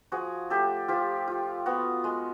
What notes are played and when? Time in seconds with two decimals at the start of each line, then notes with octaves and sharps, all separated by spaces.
0.12 F3 F#4 G#4
0.50 A3 G4 A4
0.88 F3 F4 G4
1.28 F4
1.66 B3 F#4
2.04 G#3